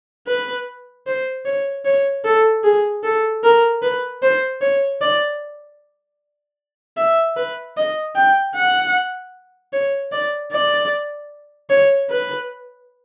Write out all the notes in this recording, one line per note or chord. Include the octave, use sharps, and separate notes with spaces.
B4
C5
C#5
C#5
A4
G#4
A4
A#4
B4
C5
C#5
D5
E5
B4
D#5
G5
F#5
C#5
D5
D5
C#5
B4